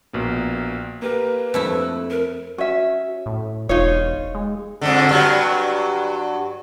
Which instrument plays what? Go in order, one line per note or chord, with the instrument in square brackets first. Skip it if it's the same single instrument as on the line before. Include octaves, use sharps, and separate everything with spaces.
[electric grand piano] A#1 B2 A#3
[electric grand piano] A#3 G4 A#4 [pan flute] B4
[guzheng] F2 A3 E4
[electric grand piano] F#6
[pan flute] A#4
[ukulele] C#4 E5 [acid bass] F#4
[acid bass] A2
[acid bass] E1 [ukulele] D#4 F4 C#5
[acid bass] G#3
[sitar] F2 G#2 D3
G2 F#3